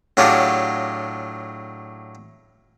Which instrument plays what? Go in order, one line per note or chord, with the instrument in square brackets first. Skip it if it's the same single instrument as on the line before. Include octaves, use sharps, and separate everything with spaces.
[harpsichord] A2 F#3 D4 F4 G4 G#4